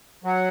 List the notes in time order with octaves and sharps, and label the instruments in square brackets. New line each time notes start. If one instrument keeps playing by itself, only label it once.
[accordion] F#3 [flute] F#5